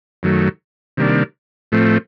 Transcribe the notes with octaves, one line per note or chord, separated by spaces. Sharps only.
F#2 D#3 F#3 A3
C3 D#3 G3 A#3 D4
A2 F3 A3 C4